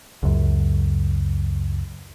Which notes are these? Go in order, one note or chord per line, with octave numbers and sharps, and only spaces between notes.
C#2 F#2